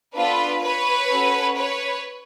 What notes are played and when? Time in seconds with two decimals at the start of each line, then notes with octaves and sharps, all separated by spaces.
0.15 B3 D4 F4 A4 B4
0.62 B4 C#5
1.09 C#4 F#4 A4
1.55 B4 C#5